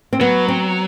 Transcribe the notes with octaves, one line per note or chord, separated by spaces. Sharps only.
C4
F#3 B3
C4